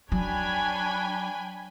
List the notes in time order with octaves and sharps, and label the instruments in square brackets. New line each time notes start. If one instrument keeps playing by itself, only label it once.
[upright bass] F#3 [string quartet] D4 C#5 G#6 [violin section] G5 G#5 B5